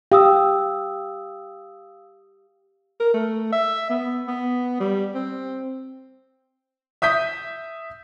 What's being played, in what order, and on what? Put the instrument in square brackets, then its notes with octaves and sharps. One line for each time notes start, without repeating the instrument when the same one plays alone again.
[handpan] G4 [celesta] F5 D#6 E6
[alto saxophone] A#4
A3
E5
B3
B3
G3
C4
[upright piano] E5 D#6 G6 B6